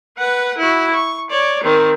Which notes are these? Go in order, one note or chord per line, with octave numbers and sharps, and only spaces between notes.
B4 F#5
E4 F#4
C#6
C#5 D5
D#3 C4